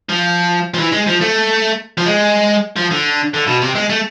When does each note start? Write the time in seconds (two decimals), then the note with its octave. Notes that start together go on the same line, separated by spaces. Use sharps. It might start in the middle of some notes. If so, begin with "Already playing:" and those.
0.09 F3
0.74 F3
0.79 E3
0.93 G#3
1.08 F3
1.21 A3
1.98 F3
2.06 G#3
2.77 F3
2.91 D3
3.34 D3
3.47 B2
3.62 C3
3.75 G#3
3.90 A3